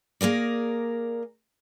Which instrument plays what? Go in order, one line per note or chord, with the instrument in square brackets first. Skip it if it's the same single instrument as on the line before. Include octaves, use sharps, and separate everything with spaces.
[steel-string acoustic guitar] A#3 G#4 A#4 D5